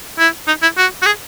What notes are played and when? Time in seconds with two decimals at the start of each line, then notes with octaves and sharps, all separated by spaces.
0.19 E4
0.47 D#4
0.62 E4
0.77 F#4
1.02 F#4
1.06 G#4